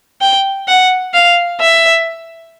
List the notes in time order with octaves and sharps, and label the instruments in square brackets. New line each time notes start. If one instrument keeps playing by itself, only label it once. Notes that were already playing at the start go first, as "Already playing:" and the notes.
[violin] G5
F#5
F5
E5